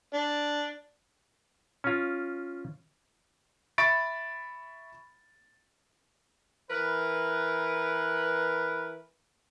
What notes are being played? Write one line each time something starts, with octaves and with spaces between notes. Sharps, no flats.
D4
C#4 F4
E5 B5 C#6 A6 D7
E3 A#4 B4